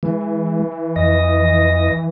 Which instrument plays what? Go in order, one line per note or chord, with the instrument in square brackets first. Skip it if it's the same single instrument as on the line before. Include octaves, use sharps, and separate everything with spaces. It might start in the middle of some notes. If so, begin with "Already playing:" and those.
[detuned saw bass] E3 [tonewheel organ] G#3
[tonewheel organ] F2 D#5 A#6